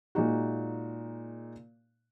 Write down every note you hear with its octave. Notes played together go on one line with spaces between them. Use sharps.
A#2 G#3 D#4 F#4